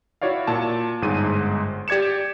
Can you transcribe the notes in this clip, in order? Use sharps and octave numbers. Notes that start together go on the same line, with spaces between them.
E4 F#4 C#5 D5 F5
A#2 A5
G1 G#2 G#3 D#7
G4 D5 G#6 C#7 E7